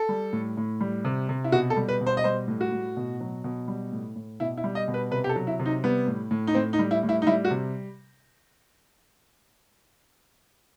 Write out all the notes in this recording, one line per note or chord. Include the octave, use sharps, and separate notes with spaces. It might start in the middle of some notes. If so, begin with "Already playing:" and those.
Already playing: A4
G3
A2
A2
G3
C3
C3
E4
B2 F#4
A4
G3
B4
B2
C5
D#5
G3 C5
A2
F#4
A2
B2
F#3
B2
G3
A2
A2
B2 E4
E4
G3
D#5
B2
B4
C3 B4
G4
A4
F#3
E4
C3
D#4
G3 B3
A2
A2
D#4
A2 C4
D#4
G3
E4
A2
E4
D#4
G3 E4
F#4
C3